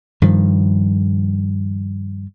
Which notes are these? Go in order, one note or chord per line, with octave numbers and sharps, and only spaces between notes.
G2 D#3 F3